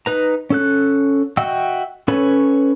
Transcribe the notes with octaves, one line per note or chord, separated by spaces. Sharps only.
D#4 B4 A#5
C#4 A4 F#6
F#4 D#5 E5 G5 E6
C#4 A4 B4 C#5 B5